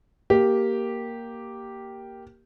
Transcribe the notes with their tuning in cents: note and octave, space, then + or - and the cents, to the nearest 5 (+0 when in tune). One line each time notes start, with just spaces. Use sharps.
A#3 +0 G4 -5